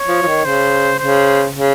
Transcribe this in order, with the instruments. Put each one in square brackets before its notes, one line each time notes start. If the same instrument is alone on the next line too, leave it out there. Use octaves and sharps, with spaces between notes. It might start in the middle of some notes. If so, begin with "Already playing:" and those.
Already playing: [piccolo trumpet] C#5
[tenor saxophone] F3
F3
D#3
[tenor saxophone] C#3 [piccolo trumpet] C5
[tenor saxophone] C#3 [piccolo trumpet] C5
[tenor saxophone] C#3